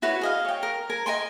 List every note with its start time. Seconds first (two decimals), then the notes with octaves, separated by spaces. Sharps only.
0.02 E4 F#4 B4 C#5
0.21 G#4 D#5 F5
0.45 C#5 G5
0.63 A#4
0.90 A#4 G#5
1.06 D#5 G5 G#5 C6